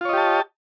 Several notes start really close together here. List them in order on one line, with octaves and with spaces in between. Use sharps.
F4 C#5 D#5 G4 A5